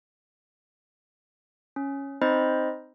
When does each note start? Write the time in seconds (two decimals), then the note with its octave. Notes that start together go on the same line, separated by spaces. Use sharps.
1.76 C#4
2.21 C4 D#4 C5 D#5 B5